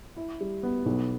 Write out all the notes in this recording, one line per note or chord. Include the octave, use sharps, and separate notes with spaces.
E4
G3
B3
B1